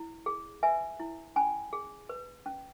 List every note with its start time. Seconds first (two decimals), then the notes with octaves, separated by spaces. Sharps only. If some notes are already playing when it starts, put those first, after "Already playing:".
Already playing: E4
0.26 G#4
0.63 B4 E5 G#5
1.00 E4
1.36 C#4 G#5 B5
1.73 G#4
2.09 B4
2.46 C#4